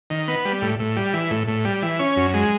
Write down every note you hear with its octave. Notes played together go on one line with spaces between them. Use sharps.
D#3
B3
G3
A2
A2
G3
E3
A2
A2
G3
E3
C#4
F#2
G#3